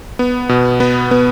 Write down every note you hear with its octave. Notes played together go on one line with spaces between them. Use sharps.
B3
B2
B3
B3